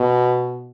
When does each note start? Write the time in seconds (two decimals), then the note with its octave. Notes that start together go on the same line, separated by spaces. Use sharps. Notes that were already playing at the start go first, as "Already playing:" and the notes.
Already playing: B2